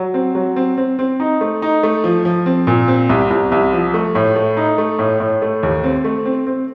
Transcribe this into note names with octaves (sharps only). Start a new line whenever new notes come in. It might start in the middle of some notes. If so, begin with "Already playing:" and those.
Already playing: F#3
C4
F#3
C4
C4
C4
D#4
A3
D#4
A3
F3
F3
C4
A#2
C4
C2
C2
C2
F3
A3
A2
A3
D#4
A3
A2
A2
A3
D#2
C4
A3
C4
C4